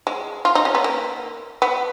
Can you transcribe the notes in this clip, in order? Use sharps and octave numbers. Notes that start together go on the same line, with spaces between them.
G#3
F4
D#4
C#4
B3
A#3
B3